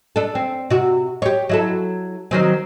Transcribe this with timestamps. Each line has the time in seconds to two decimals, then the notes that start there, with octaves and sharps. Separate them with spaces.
0.16 D4 A4
0.35 C4
0.70 C3 F#4
1.22 G4 C#5
1.49 F#3 E4 A4
2.31 D#3 F#3 C4